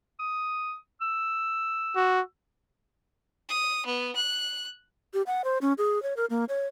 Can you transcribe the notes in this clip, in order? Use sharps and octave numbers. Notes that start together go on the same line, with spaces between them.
D#6
E6
F#4
D#6
B3
F#6
G4
F#5
C5
C#4
G#4
C#5
A#4
A#3
C#5